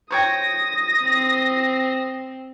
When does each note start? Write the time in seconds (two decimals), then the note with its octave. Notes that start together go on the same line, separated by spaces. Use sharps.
0.11 C5 C#5 G5 D#6 A#6
1.03 C4